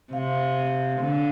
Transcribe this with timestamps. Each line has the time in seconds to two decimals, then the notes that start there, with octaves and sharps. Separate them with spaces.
0.13 C3 F5
1.01 D3